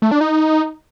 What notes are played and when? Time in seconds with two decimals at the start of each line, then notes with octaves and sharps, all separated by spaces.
0.02 A3
0.11 D4
0.21 D#4